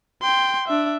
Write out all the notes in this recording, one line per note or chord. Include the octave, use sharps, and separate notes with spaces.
G5 C6
D4 E5